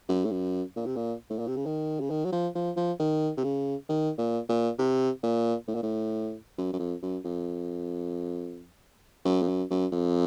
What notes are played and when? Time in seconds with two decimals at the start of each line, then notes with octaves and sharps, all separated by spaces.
0.09 F#2
0.25 A2
0.31 F#2
0.76 A#2
0.86 C3
0.96 A#2
1.30 A2
1.39 A#2
1.47 C3
1.56 C#3
1.65 D#3
2.00 C#3
2.10 D#3
2.25 F#3
2.32 F3
2.55 F3
2.77 F3
2.99 D#3
3.37 C3
3.44 C#3
3.89 D#3
4.18 A#2
4.49 A#2
4.79 C3
5.23 A#2
5.68 A2
5.75 A#2
5.83 A2
6.58 F#2
6.73 F#2
6.79 F2
7.02 F#2
7.24 F2
9.25 F#2
9.42 F2
9.48 F#2
9.71 F#2
9.92 F2